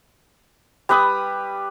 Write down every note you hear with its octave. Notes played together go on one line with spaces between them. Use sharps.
G3 B4 B5 D#6